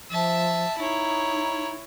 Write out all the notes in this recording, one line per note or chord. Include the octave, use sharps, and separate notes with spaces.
F3 E5 A5
D#4 E4 C#5